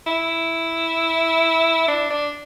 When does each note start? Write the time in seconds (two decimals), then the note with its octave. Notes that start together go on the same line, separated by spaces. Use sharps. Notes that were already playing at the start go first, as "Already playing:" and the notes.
0.07 E4
1.88 D4
2.11 D4